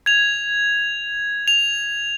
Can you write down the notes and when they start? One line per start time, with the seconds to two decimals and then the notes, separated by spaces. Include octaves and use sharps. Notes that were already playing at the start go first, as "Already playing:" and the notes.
0.06 G#6 F7
1.48 F7